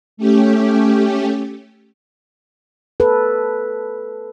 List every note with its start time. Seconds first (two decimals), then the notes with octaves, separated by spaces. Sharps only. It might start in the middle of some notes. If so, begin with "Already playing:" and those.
0.17 A3 C#4 G4
3.00 A4 B4